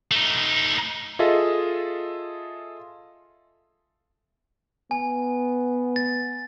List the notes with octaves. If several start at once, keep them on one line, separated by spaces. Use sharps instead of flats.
A3 D#4
F4 G#4 A4 D#5 E5
B3 G#5
A6